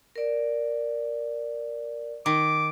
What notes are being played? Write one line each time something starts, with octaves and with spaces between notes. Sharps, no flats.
A#4 D5
D#3 D6